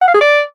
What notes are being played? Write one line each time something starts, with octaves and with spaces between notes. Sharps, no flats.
F#5
F5
G#4
D5